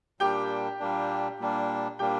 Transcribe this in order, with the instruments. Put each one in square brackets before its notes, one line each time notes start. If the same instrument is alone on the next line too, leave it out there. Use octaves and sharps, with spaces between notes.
[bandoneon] A#2 G3 A#3 D4 [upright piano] G4 G5
[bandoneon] A#2 G3 A#3 D4
A#2 G3 A#3 D4
[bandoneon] A#2 G3 A#3 D4 [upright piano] G4 G5